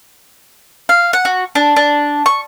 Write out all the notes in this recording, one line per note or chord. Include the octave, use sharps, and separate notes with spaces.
F5
F#5
F#4
D4
D4
C#6